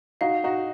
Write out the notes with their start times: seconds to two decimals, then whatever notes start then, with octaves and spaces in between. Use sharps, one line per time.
0.21 D#4 F#4 F5
0.44 D#4 F#4